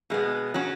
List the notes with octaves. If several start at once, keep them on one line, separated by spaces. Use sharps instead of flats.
B2 G#3 B3
F#3 C#4 F#4